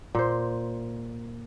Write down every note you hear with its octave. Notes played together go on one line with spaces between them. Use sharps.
A#2 C5